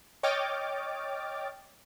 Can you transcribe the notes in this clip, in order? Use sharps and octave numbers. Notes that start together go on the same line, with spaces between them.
C#5 D#5 G5 D6 F6 A6